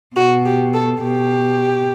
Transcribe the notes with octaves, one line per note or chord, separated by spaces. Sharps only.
B2 F#4
G4
A4
B2 G4